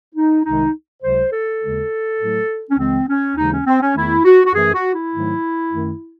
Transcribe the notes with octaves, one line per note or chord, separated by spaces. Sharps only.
D#4
C2 C3 D#3 G#3 D#4
C#2 C3 F#3 C5
A4
D#2 C#3 G#3
A2 F#3 A3
C#4
C#2 C#3 E3 G#3 C4
C#4
D#2 C#3 E3 G#3 D#4
C#4
C4
C#4
E2 D#3 A3 E4
F#4
F#4
F#2 E3 A3 G#4
F#4
E4
G#2 D#3 F#3 A3
F#2 D#3 A3